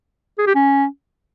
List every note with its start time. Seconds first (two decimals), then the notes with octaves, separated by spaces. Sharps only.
0.38 G#4
0.47 G4
0.55 C#4